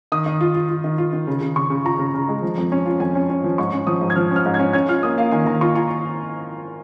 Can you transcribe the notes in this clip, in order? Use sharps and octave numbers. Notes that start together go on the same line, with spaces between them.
D#3 D#6
D#3
F4
F4
F4
D#3
F4
D#3
C#3
C#3
C#3 C#6
C#3
F4 A#5
C#3
C#3
G#3
F3
F2
C#4
F4
F2 G#5
C#4
C#4
F3
G#2 C#6
C#4
F3 D#6
G#2
G#6
F3 F6
C#4
F6
G#2
C#4 G#6
C#4 G#6
F4 F6
A#3 D#6
A#3 F5
D#3 G#5
D#3 A#5
F4 C#6
F4 G#5